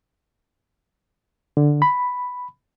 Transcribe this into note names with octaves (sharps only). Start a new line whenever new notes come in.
D3
B5